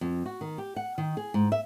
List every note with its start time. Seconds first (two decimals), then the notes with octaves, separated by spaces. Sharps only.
0.01 F2
0.26 F#4
0.41 D#3
0.58 G4
0.76 F#5
0.98 D#3
1.17 G#4
1.34 G#2
1.52 E5